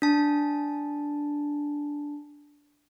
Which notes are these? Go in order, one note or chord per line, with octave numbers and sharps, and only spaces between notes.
D4 A5